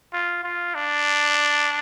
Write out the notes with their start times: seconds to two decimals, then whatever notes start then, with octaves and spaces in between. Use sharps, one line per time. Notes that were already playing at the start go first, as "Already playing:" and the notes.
0.13 F4
0.43 F4
0.75 D4